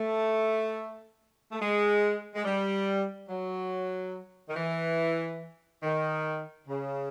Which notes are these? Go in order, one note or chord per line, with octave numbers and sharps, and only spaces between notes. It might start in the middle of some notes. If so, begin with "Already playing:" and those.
Already playing: A3
A3
G#3
G#3
G3
F#3
D#3
E3
D#3
C#3